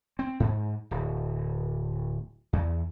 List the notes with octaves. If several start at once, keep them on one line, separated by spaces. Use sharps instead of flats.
C4
G#2
D1
E2